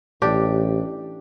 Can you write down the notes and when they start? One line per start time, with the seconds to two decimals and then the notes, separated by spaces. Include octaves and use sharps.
0.22 A1 D4 G4